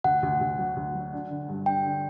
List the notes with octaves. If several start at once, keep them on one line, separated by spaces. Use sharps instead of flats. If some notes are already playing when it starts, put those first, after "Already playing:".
D2 F#5
D2
D2
F#3
D2
F#3
D4
D3
G2
D4 G5
D3